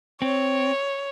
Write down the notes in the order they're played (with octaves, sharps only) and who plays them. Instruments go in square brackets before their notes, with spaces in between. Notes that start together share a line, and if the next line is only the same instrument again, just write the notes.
[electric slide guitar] C4 [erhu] C#5